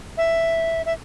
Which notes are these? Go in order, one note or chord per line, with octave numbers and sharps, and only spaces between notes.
E5
E5